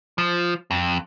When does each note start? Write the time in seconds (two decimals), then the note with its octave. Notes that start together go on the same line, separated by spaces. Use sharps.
0.18 F3
0.71 F2